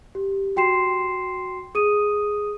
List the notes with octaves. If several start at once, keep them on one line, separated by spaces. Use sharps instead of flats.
G4
F#4 G5 C6 C7 E7
G#4 D#6 D#7